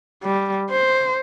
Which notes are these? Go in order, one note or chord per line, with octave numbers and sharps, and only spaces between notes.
G3
C5